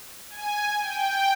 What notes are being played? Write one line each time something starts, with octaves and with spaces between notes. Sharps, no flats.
G#5
G5